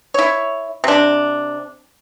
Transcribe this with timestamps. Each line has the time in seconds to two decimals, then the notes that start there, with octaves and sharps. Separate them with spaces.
0.14 E4 C#5
0.84 C3 D4